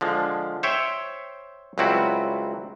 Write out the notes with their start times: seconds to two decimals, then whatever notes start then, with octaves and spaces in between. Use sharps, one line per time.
0.01 D3 F3 G#3
0.63 C5 C#5 E5 G5
1.78 C#2 F#3 G3 C4 E4 F#4